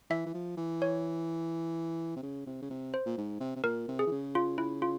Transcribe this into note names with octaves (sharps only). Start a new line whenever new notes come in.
E3 E5
E3
F3
E3
C#5
C3
C#3
C3
C#3
C3
C5
A#2
G#2
C3
C3
A#2 A#4
C3
G#4
E3
C#3
F4
E4
F4